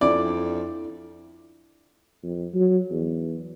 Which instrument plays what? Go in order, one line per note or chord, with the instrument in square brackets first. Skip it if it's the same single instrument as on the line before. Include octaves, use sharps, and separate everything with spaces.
[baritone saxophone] F2 [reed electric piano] D4 E4 [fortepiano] D5
[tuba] F2
F#3
E2